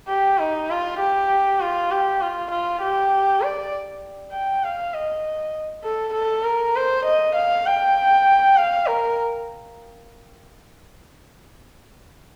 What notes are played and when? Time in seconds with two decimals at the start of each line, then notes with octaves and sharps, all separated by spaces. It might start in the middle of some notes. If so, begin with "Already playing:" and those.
0.08 G4
0.39 D#4
0.70 F4
1.00 G4
1.60 F4
1.91 G4
2.21 F4
2.51 F4
2.82 G4
3.42 D5
4.32 G5
4.64 F5
4.94 D#5
5.84 A4
6.14 A4
6.44 A#4
6.76 C5
7.06 D#5
7.35 F5
7.66 G5
8.57 F5
8.87 A#4